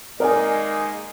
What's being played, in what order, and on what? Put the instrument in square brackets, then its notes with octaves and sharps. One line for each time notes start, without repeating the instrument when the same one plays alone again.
[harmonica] G#3 A#3 D#4 [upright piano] A#4 D5 G#5